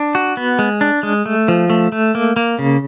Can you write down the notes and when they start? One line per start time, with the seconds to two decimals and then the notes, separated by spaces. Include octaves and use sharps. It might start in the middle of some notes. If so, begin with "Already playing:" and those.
Already playing: D4
0.15 F#4
0.37 B3
0.59 G#3
0.81 D4
1.03 G#3
1.26 A3
1.48 F3
1.70 A3
1.92 A3
2.15 A#3
2.36 A#3
2.59 C#3